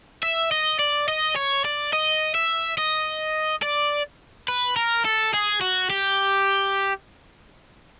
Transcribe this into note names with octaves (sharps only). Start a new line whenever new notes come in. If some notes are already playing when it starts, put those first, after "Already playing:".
E5
D#5
D5
D#5
C#5
D5
D#5
E5
D#5
D5
B4
A#4
A4
G#4
F#4
G4